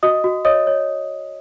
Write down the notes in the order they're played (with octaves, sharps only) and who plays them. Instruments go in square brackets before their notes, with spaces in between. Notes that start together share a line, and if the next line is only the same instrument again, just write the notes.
[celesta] F#4 D#5 D#6
F#4
C#5 D#5 D#6
C#5